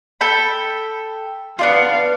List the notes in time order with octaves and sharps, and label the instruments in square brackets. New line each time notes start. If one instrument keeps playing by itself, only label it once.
[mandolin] A4 G5 B5
[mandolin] B3 D4 F4 [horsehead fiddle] F5